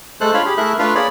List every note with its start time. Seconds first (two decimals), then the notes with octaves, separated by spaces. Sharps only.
0.21 G#3 A3 A4 C5 F#6
0.34 D4 F4 C#5 F5 B5
0.46 G4 G#4 B5
0.57 A3 E4 G#4 A#4 E5 F#6
0.79 A3 D4 F4 B4 F5
0.95 A#3 G#4 C#5 D5 B5